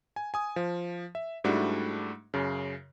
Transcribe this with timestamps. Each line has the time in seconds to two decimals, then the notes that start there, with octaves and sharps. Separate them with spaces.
0.16 G#5
0.34 G#5 D#6
0.56 F3
1.15 E5
1.44 G#2 G3 A3 D4 E4 F#4
2.34 F#2 C#3